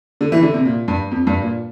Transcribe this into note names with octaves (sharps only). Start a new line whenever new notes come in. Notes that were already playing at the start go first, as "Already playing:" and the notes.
D3
E3
D3
C3
A#2
G2
F2
G2
A#2